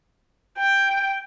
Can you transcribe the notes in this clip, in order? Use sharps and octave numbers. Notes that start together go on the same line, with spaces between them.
G5